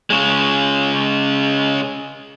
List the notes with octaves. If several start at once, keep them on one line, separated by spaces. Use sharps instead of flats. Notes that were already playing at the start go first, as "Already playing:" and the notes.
C#3 G#3